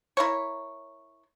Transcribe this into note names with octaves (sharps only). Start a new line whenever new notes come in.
E4 A#4 C#5